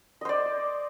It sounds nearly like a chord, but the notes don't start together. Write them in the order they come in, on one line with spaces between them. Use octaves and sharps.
D#5 C5 D5